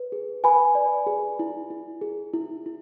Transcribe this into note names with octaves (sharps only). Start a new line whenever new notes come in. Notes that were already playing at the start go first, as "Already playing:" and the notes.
Already playing: B4
G#4
B4 G#5 B5
D5
G#4
E4
E4
G#4
E4
E4